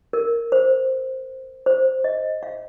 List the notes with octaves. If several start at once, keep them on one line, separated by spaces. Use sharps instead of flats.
A#4
C5
C5
D#5
F5